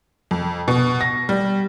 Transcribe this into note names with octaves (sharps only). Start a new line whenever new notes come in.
F2
B2
A#6
G3